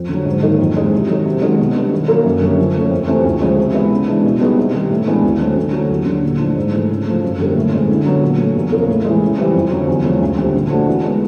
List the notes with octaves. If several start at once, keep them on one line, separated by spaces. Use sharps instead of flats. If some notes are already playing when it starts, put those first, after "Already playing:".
Already playing: F2
D3
F#3
G#2
D#3 F#3 A#3 D#4
F2
C#3 E3 G#3
C3
D#3 F#3
C3
D#3 G#3 C#4 F#4
B2
G3 B3 D4
D#3
F#3 A#3
F#2
D3 G3 A#3 C#4
F3
A3 C#4
F2
C3 E3 A3 C4
D2
C#3 F3 G#3 C4
C3
E3 G#3 B3 E4
C#3
E3 G#3 B3 D4
B2
G3 B3 D#4 G#4
C3
D#3 G3
A2
E3 G#3 B3 D4
D2
D3 F#3 A3 C4
D3
F#3 A3 C#4 E4
D#2
D3 F#3
A#2
F3 A3 D4
G#2
E3 A3
C#3
F3 A3
F#2
D3 G3 A#3 C#4
A2
E3 G#3 C4
D3
F#3 B3
A#2
F#3 A3
E2
C#3 F3 A#3
A2
E3 G#3
C#3
E3 G3 C4
F2
D3 F#3
E2
C#3 F3 G#3 C#4
D2
D3 G3 C4
A#2
F3 A3 D4 F#4
E3
G#3 B3